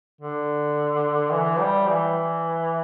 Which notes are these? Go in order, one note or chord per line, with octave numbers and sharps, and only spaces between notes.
D3
E3
G3
E3